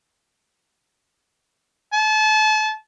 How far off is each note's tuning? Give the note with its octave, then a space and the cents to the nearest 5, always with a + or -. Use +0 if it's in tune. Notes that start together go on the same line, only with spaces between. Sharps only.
A5 -35